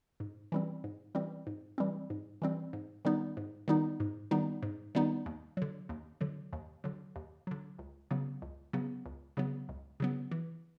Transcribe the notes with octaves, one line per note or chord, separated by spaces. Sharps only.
G#2
E3 G3 C4
G#2
E3 G3 C4
G#2
E3 G3 C4
G#2
E3 G3 C4
G#2
D#3 G3 B3 D#4
G#2
D#3 G3 B3 D#4
G#2
D#3 G3 B3 D#4
G#2
D#3 G3 B3 D#4
D#2
D3 F#3
D#2
D3 F#3
D#2
D3 F#3
D#2
D3 F#3
C#2
C#3 F#3 B3
C#2
C#3 F#3 B3
C#2
C#3 F#3 B3
C#2
C#3 F#3 B3
E3